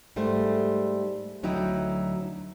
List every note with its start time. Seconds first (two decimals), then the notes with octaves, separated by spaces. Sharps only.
0.16 G#2 G3 A3 C5
1.43 D2 F#3 D#4 E4 G5